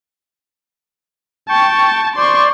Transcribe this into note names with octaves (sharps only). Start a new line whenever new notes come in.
G5 A5 C#6
C5 D5 C6 C#6